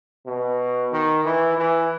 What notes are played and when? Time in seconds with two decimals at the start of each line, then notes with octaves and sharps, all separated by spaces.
0.26 B2
0.93 D#3
1.25 E3
1.58 E3